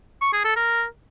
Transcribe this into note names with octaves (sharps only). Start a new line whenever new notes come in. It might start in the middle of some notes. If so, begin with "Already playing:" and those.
C#6
G#4
A4
A#4